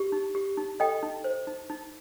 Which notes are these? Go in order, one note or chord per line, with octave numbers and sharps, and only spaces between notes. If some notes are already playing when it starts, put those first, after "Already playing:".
Already playing: G4
D#4
G4
D#4
A4 D#5 G5
D#4
C5
D#4
D#4